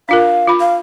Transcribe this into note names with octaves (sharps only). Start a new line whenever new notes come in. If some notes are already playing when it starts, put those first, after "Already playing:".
D4 F4 A#4 F5
F4 B5
F5